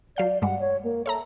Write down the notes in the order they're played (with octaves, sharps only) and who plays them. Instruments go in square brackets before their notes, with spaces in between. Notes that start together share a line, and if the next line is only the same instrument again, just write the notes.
[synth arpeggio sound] F#3 F5 G6 [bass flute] D5
[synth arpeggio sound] G2 G3 G#3 [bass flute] F#5
[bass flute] C#5
A#3
[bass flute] A4 [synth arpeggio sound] C#5 E5 A#5